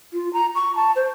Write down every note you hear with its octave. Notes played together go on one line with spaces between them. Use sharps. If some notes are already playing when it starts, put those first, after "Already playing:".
F4
A#5
C#6
A5
C5